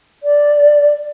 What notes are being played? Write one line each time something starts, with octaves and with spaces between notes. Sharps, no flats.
D5